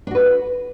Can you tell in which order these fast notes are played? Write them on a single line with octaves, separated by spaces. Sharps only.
D4 F#4 B4